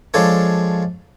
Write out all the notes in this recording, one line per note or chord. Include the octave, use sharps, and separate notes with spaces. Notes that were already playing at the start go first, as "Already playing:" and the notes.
F3 G#3 D4 A4 C#5